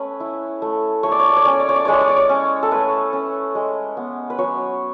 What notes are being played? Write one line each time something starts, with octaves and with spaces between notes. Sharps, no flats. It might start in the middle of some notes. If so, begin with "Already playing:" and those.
Already playing: A3 C#4 B4 C#5
E4
A3
A3 C#5
D5
C#5
D5
C#5
C#4 D5
C#5
D5
C#5
D5
G#3 C#5
D5
C#5
D5
C#5
C#4
A4
A3 B4
C#4
G#3
B3
B4
F#3 C#5